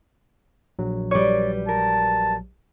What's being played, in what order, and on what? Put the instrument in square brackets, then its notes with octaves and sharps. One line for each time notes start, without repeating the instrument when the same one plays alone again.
[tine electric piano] A#1 F#3
[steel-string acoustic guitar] G3 B4 [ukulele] C#5 D5
[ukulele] A#4 [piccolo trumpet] A5